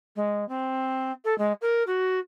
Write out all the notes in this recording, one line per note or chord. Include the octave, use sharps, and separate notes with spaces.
G#3
C4
A4
G#3
A#4
F#4